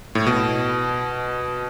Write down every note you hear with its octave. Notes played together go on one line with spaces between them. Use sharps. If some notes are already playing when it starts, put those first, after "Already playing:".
A2
B2